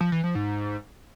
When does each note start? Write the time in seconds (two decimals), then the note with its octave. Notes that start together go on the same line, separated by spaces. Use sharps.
0.01 F3
0.12 E3
0.24 F3
0.35 G#2